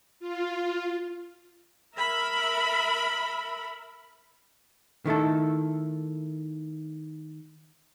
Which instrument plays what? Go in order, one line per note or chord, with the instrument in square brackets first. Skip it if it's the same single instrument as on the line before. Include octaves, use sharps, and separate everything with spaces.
[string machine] F4
[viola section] A#4 E5 B5
[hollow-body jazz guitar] D#3 A3 E4 A4